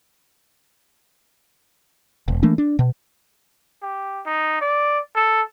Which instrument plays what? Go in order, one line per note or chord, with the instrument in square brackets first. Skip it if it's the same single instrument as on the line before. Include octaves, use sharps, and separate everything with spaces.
[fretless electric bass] E1
E3 A3 A#3 D4
D4
B2
[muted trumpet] G4
D#4
D5
A4